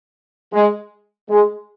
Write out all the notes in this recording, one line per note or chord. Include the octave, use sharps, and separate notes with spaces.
G#3
G#3